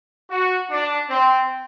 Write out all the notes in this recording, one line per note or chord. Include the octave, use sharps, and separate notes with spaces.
F#4
D4
C4